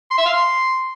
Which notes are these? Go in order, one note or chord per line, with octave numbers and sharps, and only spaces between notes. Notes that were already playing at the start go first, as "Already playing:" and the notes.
C6
E5
F5
C6